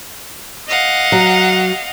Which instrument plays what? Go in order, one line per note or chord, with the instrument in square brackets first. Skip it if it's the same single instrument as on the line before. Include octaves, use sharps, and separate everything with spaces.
[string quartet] D#5 F5 F#5
[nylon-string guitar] F#3